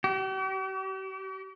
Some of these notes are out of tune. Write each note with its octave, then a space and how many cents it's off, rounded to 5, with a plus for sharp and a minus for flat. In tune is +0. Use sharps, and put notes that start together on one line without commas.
G4 -45